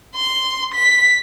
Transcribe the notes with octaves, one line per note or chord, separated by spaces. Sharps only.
C6
B6